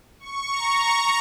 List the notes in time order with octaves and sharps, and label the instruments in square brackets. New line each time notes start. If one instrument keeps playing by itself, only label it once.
[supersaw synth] C#6
A#5
A#5